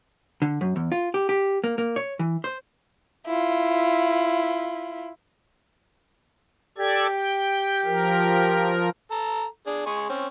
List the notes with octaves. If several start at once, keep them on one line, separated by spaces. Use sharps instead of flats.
D3
F#2
E2
F4
G4
G4
A#3
A#3
C#5
E3
C5
E4 F4
G4 A4 D5 G#6
G5
F3 A#4
A4 A#5
D4 G#4
G#3 G#5 C#6
C4 C#4